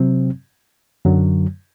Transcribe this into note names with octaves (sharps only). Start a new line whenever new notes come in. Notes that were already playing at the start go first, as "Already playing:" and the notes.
Already playing: C3 F#3 C4
F#2 D3 F#3